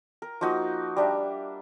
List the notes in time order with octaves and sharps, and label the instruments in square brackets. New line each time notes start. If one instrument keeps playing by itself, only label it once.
[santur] A#4
F3 A#3 D#4 F#4
G3 D4 E5